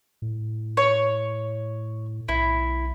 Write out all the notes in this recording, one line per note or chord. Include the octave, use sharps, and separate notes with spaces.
A2
C#5
B1 E4